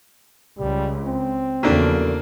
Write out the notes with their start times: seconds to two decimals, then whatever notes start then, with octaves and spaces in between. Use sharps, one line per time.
0.59 C#2 G3
1.07 C4
1.63 E2 C#3 F3 A#3 D4 F#4 A4 A#4